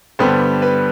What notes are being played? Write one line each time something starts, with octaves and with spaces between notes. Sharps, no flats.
G2 D3 G3 B3 C5
B4